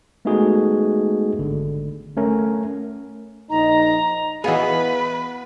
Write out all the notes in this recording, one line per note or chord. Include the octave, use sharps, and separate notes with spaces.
G#3 A3 B3 D#4 F#4 G#4
G#1 D3
A3 C#4 A#4
A#1 D#4 A#5
E3 B3 F#4 G#4 B4 D#5 F5 F#5